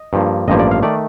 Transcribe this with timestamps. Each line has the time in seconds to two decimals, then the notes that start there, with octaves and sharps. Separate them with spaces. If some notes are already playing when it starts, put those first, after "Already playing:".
Already playing: D#5
0.13 G2 F3 A#3
0.48 A1 G2 F3 A#3 D#5
0.59 D5
0.71 F5
0.83 D#3 A3 D5